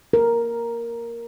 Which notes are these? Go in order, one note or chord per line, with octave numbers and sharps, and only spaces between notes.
A#4